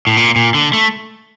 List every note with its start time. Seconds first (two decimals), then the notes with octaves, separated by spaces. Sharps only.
0.07 A2
0.17 A#2
0.36 A#2
0.54 D3
0.73 A3